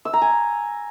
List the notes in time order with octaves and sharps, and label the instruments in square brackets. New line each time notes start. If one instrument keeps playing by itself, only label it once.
[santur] E6
A#5
G#5